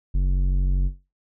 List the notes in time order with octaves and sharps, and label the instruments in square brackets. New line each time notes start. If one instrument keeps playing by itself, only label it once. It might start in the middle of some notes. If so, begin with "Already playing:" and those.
[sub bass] F#1